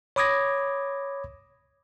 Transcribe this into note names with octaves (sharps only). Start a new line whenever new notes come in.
C#5 B5 D6 D#6 G#6 A#6